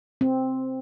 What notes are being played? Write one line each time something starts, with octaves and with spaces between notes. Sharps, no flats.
C4